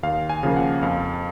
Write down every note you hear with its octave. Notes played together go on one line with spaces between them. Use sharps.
D#2 F5
G#5
C#3 F3 A#3
F#5
F2 F5